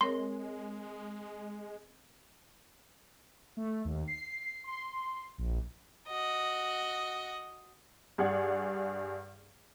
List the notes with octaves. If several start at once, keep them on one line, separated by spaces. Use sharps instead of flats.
G#3 C4 A#4 C#5 C6
A3
D#2
C7
C6
A#1
F#4 D#5
G2 G#4 D5 F#5 G#6